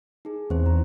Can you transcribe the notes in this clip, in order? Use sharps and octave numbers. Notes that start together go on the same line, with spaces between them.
D#4 G#4
E2 C4 C5
A#5